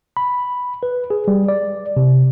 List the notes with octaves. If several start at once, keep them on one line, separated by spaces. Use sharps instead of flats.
B5
B4
G#4
G3
D5
C3